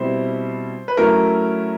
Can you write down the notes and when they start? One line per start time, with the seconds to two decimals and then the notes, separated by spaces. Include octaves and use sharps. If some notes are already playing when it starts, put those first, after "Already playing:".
Already playing: B2 G3 C4 E4 C5
0.88 B4
0.97 F#3 A3 C#4 E4 A#4